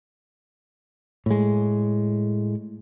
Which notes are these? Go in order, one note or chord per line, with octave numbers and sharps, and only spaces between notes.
A2 G#3